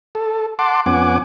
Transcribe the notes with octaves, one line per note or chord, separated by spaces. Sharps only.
A4
F#5 A5 C6 D6
F2 B3 C#4 F#5 G#5 D6